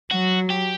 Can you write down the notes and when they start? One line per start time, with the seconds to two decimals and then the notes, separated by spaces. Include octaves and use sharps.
0.11 F#3 F#4
0.50 G4